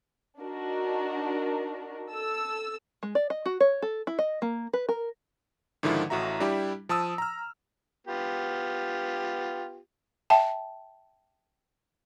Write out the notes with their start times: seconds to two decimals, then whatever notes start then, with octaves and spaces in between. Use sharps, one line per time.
0.40 D4 D#4 F#4 A#4
2.09 A4 E6
3.03 G#3
3.15 D5
3.30 D#5
3.46 F#4
3.60 C#5
3.82 A4
4.07 E4
4.19 D#5
4.42 A#3
4.73 B4
4.89 A#4
5.83 G#2 D3 D#3 F3 E4
6.10 A1 A2 F#4 E5 A#5
6.40 G3 D4 E4 G4
6.89 F3 A5 D#6 E6
7.18 A#5 F6
8.07 B3 F4 G4
10.30 E5 G5 A5